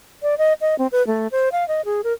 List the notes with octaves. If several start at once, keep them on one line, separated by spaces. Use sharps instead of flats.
D5
D#5
D#5
C4
B4
A3
C5
F5
D#5
G#4
A#4